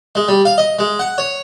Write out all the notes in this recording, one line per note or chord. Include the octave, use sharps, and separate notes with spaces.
G#3
G3
F5
D#5
G#3
F#5
C#5